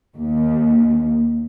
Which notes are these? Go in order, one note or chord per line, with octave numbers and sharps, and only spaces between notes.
D#2